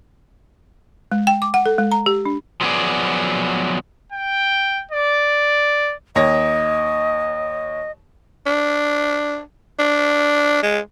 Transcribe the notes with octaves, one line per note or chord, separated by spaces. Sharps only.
G#3
G5
D6
F#5
A4
G#3
A#5
G4
D4
F3 F#3 A3 B3 G#4 D5
G5
D5
D#2 C#5 D#5 A#6
D4
D4
G#3